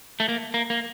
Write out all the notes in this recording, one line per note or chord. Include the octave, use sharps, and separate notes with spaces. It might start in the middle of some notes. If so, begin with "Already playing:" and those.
A3
A#3
A#3
A#3